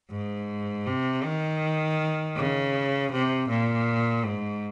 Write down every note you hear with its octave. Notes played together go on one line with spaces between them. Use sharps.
G#2
C3
D#3
C#3
C3
A#2
G#2